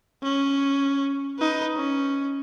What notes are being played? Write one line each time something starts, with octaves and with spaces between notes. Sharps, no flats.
C#4
D#4 B4
C#4